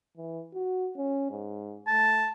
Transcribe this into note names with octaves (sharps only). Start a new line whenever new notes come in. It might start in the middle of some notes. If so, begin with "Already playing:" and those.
E3
F#4
C#4
G#2
A3 A5